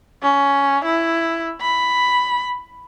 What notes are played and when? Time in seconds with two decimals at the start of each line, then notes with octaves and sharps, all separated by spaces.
0.23 C#4
0.85 E4
1.61 B5